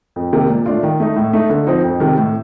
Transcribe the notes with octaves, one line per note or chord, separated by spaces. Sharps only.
F2
C3 D#3 A#3
A#2
A3 D4 F4
D#3
A3 D#4
A2
A3 D#4
D3
F3 C4 D#4
F2
C3 D#3
A2